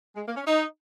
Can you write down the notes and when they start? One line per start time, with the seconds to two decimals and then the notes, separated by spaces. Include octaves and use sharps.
0.16 G#3
0.27 A#3
0.36 C#4
0.47 D#4